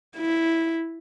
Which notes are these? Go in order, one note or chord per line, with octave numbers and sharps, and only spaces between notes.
E4